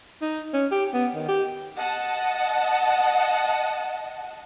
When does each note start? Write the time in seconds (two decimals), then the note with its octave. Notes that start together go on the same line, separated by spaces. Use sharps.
0.22 D#4
0.53 C#4
0.71 G4
0.93 B3
1.15 D#3
1.28 G4
1.76 D#5 F#5 A5